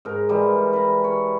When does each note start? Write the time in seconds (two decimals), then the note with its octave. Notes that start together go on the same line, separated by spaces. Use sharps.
0.05 G#2 A#4
0.29 E3 G3 G#3
0.73 B4 A#5
1.04 C#5